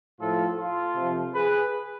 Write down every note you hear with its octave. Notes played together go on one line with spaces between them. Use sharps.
A2 F3 F4 A4
F4 A4
C3 F3
G#4 B4